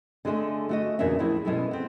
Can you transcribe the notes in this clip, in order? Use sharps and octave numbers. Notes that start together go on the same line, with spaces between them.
D3 G#3 A3 G#4 A4 G#5
A3 F#4 D#5
E2 A#2 C#3 A#3 D4 E5
A2 F3 E4 G#4
B2 G3 G#3 C#4 E4 A4
B3 C4